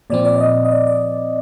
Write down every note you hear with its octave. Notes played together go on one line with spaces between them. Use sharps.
A#2 F3 C4 D5
D5
D5
D#5
D#5
D5
D5